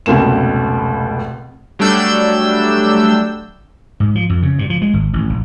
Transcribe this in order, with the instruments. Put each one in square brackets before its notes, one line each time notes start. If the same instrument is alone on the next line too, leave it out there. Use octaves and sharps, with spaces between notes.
[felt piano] F1 C#2 B2 A#3 E7
[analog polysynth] F#3 G3 A3 D4 E6 G6
[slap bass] G#2
F3
F2
C#3
G2
F3
G#3
G#1
A1
A#1